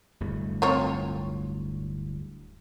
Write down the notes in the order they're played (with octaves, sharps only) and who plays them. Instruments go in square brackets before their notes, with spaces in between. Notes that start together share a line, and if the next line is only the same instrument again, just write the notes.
[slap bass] D1 G2 A3
[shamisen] C4 F4 C#5